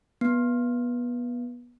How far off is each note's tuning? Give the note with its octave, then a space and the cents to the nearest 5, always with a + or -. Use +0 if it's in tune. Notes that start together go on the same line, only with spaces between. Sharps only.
B3 -25